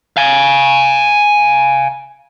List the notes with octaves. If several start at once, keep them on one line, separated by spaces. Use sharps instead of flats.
F5 G#5